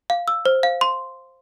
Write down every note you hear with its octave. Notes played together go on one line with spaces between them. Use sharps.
F5
E6
C5
F5
C6